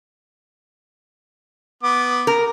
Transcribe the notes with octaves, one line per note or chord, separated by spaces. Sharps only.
B3 D6
A#4